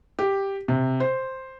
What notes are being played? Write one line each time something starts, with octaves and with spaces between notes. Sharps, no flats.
G4
C3
C5